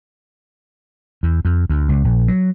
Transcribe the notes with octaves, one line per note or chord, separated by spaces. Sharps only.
E2
F2
D2
C#2
A#1
F#3